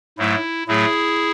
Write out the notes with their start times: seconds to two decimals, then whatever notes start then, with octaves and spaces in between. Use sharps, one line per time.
0.18 G#2 F#3 A3 E4
0.68 A2 F#3 A3 E4 G#4